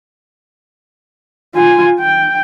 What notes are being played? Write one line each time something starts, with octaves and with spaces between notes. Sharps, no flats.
F4 G#5
G5